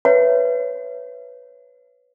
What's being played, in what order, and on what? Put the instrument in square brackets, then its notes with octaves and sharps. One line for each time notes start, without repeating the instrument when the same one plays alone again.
[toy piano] B4 C#5 E5 F#5